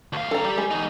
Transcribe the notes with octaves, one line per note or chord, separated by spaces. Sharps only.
D2 F5
A4 A#5
G3 G4
G#3
E2 D#4